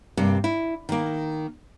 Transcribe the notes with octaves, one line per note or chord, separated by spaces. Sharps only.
G2 C3 A#3
E4
D#3 A#3